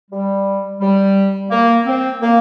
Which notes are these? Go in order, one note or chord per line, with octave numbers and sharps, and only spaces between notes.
G3
G3
A#3
C4
A#3